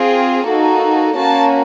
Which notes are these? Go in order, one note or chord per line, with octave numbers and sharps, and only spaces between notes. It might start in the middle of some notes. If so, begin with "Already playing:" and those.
Already playing: C4 F4 G#4
A#3 D#4 F#4 A4
A#3 C#4 F#4 A5